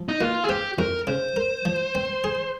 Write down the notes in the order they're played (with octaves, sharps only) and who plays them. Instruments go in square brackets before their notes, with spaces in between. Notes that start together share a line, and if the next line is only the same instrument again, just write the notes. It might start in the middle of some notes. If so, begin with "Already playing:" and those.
Already playing: [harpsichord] F3
[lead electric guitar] D#4
[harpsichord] A#3 [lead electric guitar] F4
[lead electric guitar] G#4
[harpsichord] C4 [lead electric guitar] G4
[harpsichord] F2 [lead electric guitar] A#4
[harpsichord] C#3 [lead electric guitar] C5
[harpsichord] A#4
F3
C4
G#4